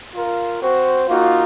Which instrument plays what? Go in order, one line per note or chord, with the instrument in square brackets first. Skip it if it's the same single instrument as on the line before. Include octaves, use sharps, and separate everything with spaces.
[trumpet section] F4 A#4 F5
C4 F#4 C5
[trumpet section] A#3 D#4 F#4 [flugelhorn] F4